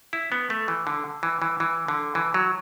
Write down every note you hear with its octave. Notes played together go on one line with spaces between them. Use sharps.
E4
B3
A3
E3
D3
E3
E3
E3
D3
E3
F#3